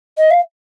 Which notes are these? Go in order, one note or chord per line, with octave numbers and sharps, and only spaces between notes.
D#5
F5